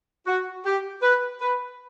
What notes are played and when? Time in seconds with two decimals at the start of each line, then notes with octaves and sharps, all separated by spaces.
0.27 F#4
0.66 G4
1.02 B4
1.41 B4